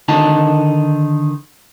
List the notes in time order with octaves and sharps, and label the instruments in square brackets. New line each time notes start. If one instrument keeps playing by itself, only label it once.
[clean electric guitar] D3 D#3 D#4 A5